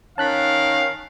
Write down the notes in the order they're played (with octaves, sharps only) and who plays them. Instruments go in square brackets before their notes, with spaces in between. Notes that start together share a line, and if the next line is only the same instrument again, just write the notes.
[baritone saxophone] D#3 [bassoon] C#4 [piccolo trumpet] F5 [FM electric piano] A5 F#6 B6